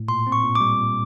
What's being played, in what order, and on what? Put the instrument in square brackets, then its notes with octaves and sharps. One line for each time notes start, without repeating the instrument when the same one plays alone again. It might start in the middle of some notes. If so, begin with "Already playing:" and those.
Already playing: [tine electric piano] A2
[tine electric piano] A#2 [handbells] C6
[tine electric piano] C4
[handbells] C#6
[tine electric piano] A#2
[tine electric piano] G3 [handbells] D6
[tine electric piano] A#2